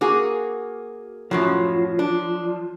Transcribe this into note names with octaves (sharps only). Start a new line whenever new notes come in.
A#3 F#4 G#4
F#2 A2 F3 F#3
D4